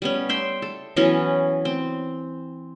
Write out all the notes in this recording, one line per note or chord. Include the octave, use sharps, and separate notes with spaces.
G3 B3 C#4
E5 G5 C6
A4
E3 F#3 B3 C#4
C4